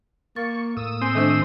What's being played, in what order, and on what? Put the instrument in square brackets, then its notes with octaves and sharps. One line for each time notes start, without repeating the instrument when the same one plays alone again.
[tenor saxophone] A#3 [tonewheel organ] C#6 [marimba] A6
[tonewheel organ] A2 D#6 E6 [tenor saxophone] A#3
[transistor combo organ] C4 [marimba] G#5
[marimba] D#3 D4 C5 [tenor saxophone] A3